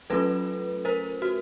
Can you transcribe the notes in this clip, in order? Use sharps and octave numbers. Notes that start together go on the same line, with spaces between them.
F#3 A3 C#4 F4 A4 B4
A#4 C5
F#4